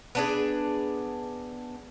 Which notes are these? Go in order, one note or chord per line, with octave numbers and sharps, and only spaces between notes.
B3 D4 G#4